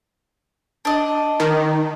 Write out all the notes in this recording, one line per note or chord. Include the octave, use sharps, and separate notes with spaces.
D4 D#5
D#3